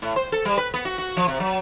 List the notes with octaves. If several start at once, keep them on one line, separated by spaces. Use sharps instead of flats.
A2
C5
A4
G3
B4
B3
F#4
F#4
F3
C3
F#3